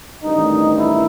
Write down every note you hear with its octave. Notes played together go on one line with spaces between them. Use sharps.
A1 G2 D#3 D#4
E4